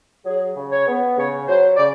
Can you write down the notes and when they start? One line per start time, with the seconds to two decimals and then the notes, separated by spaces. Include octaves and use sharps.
0.25 F#3 G#4
0.56 C#3
0.71 C#5
0.87 B3
1.17 C#3 C#5
1.48 F#3 C5
1.76 D5
1.79 C#3